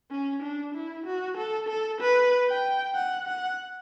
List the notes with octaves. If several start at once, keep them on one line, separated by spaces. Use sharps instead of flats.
C#4
D4
E4
F#4
A4
A4
B4
G5
F#5
F#5